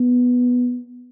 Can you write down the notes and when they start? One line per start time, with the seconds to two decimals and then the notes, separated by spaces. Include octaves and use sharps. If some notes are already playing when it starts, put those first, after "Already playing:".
Already playing: B3